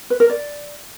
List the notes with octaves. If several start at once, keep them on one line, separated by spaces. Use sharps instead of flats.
B4
A#4
D5